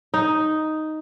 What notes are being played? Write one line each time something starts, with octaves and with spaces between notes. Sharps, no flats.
D#4